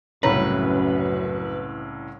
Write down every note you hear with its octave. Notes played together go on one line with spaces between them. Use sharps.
C2 F#2 A2 C#3 B4 C#5 A#5